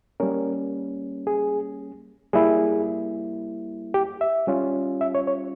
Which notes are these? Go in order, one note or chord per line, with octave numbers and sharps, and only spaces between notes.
G3 A#3 C#4 A#4
G#4
G3 A#3 E4 G#4
G4
E5
G3 C#4 F4
E5
C#5
C#5